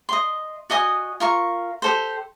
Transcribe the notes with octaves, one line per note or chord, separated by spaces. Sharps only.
D#5 C6
F#4 D#5 G#5 D#6
F4 A#4 C#6
G4 A4 C5